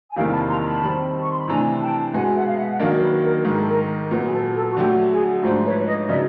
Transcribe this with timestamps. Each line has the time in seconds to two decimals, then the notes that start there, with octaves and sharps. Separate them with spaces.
0.10 G#5
0.16 E2 C3 D#3 G3 A#3 F5 G5
0.32 A5 B5
0.49 A#5 C6
0.65 A5 B5
0.81 D#3 G3 C4
1.20 C#6
1.30 C6
1.39 B5
1.47 C3 E3 A3 D4 G#5 A#5
1.81 G5 A5
2.13 B2 G#3 B3 F#5 G#5
2.35 E5 F#5
2.47 F5
2.57 E5 F#5
2.71 F#5
2.79 D#3 F#3 A#3 D4 D#5 F5
2.97 A#4
3.01 B4
3.24 A#4
3.45 G#2 D#3 G#3 B4
3.53 A#4
3.61 A4
3.69 A#4
4.11 A#2 F#3 B3 B4
4.26 G#4
4.32 A4
4.55 A4
4.70 F#4
4.76 D3 F#3 A3 G4
5.10 G#4
5.43 G#2 F3 A3 D4 C5
5.65 B4 C#5
5.86 C#5 D#5
6.08 C#3 F#3 B3 D#4 D5 E5